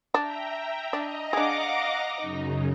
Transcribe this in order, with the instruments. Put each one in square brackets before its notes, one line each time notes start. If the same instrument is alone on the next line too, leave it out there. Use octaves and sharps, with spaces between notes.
[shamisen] D4 [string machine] E5 G5 A#5
[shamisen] D4 [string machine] D#5 A#5 A#6
[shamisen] D4 G#4 [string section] F5 F#5 D6
[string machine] F#2 C#3 [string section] D#4